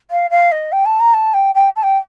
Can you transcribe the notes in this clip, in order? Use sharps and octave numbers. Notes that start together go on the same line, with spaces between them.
F5
F5
D#5
G5
A5
A#5
A5
G5
G5
A5
G5